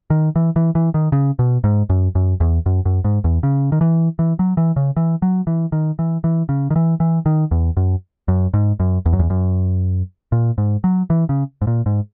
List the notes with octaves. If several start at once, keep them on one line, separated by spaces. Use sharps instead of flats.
D#3
E3
E3
E3
D#3
C#3
B2
G#2
F#2
F#2
E2
F#2
F#2
G#2
E2
C#3
D#3
E3
E3
F#3
E3
C#3
E3
F#3
E3
D#3
E3
E3
C#3
D#3
E3
E3
D#3
E2
F#2
F#2
G#2
F#2
E2
F#2
E2
F#2
A#2
G#2
F#3
E3
C#3
G#2
A#2
G#2